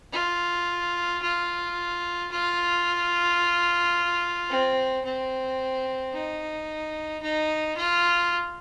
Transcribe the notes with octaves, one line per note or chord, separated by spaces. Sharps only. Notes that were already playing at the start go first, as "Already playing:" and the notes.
F4
F4
F4
C4
C4
D#4
D#4
F4